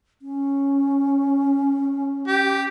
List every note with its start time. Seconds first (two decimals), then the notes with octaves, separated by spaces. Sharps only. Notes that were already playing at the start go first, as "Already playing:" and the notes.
0.22 C#4
2.28 G4